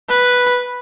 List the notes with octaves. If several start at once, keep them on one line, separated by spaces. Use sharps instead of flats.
B4